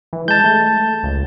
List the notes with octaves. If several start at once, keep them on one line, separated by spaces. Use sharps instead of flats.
E3
G#3 A5 G6
A3
C#2